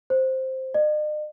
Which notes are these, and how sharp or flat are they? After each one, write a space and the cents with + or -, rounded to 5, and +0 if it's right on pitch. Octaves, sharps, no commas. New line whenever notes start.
C5 +5
D#5 -45